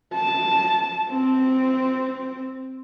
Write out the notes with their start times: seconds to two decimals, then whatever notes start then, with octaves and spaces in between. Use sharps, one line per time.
0.15 A5
1.10 C4